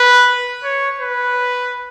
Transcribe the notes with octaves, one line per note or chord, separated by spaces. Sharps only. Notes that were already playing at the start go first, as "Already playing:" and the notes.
Already playing: B4
C#5
B4